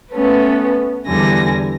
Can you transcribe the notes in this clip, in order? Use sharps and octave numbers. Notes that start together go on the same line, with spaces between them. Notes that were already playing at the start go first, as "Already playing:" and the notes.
A3 B3 C#4 B4
E2 D3 G3 G#5 A#6